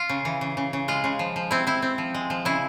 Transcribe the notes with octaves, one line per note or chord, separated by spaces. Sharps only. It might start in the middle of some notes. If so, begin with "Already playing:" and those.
Already playing: F4
C#3
E3
C#3
C#3
C#3
G#3 F4
C#3
F3
F3
C4 E4
C4 E4
C4
F3
G#3
F3
C#3 E4